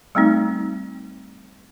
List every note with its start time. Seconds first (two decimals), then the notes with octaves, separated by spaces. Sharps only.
0.15 G3 A3 C4 D#4